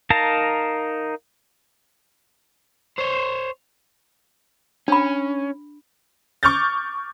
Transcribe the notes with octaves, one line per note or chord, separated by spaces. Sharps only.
D#4 A#4 F5 A5 A#5
C5 C#5
C#4 D4 B5
C#6 D6 F6 G6 A6